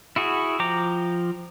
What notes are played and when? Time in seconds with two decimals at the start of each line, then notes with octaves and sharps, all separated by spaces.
0.16 E4 F#4 G#4
0.60 F3 G5 A#5 D6